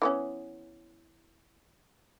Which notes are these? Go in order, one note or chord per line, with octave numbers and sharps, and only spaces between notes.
E3 B3 C#4